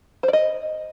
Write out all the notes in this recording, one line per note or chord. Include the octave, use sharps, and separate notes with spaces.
C5
D5
D#5